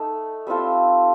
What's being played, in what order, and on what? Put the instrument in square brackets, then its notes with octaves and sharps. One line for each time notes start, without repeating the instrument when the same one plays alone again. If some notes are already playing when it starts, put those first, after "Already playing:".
Already playing: [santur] A3 D#4 A4
G3 C4 F4 A4